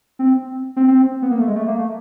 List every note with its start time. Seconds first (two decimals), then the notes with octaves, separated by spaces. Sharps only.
0.19 C4
0.76 C4
0.88 C4
1.22 B3
1.31 A#3
1.39 A3
1.47 G#3
1.56 A3
1.68 A#3
1.79 A3